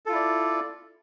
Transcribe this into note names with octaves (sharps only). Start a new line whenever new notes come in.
E4 F4 A4 D5